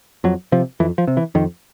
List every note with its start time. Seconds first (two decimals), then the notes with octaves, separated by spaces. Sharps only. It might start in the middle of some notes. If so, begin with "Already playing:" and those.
0.24 F2 F#3
0.52 C3 F3
0.80 F2 E3
0.98 F3
1.07 C3
1.17 E3
1.35 F2 D#3